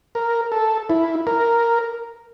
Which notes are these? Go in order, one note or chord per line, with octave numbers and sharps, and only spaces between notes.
A#4
A4
E4
A#4